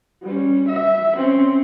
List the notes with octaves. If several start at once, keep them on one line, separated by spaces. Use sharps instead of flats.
G3 C#4
E5
C4 C#4